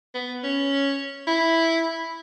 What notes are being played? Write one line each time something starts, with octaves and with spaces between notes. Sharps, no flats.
B3
C#4
E4